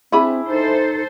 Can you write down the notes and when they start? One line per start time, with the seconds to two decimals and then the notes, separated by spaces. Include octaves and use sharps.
0.12 C4 D4 E4 G#4 B5
0.49 D#4 A4 C5